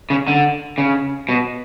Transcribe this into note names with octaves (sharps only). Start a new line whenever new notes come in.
C#3
D3
C#3
B2